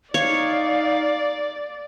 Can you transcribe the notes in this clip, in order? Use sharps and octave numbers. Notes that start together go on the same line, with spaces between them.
D#4 C#5 D5 F5